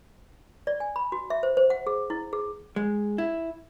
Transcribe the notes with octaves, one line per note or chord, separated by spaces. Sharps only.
D5
G#5
B5
F#4
E5
C5
C5
F#5
G#4
E4
G#4
G#3
E4